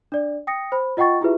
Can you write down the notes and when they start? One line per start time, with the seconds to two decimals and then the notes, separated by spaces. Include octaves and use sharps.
0.12 D4 D5
0.47 G5 D#6 A#6 C#7
0.72 C5 B5
0.97 F4 D#5 F#5 G5 C#6 A6
1.21 E4 F4 G4 G#4 B4 E5